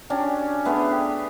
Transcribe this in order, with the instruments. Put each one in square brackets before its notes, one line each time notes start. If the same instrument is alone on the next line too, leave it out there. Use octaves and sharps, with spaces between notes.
[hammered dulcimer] C#4 D4 F#4 G4
A3 B3 D4 G#4
G4